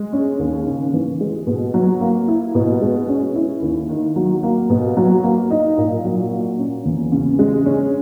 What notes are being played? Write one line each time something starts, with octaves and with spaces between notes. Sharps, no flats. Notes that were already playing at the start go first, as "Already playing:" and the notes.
Already playing: G#3
C#4
D#2
C#3
E3
G#3
B2
F#3
A#3
E4
B2
G#3
C#4
E4
D#2
D#3
F#3
A#3
B2
F#3
A#3
D#4
A#2
F#3
A#3
C#4
E2
C#3
G#3
C#4